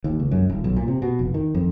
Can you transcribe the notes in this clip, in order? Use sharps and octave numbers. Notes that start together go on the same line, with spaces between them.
D#2
C#2
F#2
D#1
B1
A#2
C3
B2
F1
D#3
F2